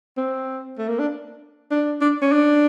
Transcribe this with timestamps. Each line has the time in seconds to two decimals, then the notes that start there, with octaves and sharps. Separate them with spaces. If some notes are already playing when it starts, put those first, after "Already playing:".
0.17 C4
0.78 A3
0.89 A#3
0.99 D4
1.71 D4
2.01 D4
2.22 C#4
2.32 D4